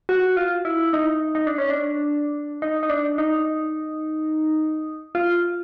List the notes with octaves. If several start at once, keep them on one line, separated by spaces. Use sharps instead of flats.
F#4
F4
E4
D#4
D#4
D4
C#4
D4
D#4
D#4
D4
D#4
F4